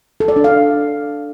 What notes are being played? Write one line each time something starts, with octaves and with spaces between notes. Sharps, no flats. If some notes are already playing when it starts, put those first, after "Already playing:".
A4
D5
D4
F5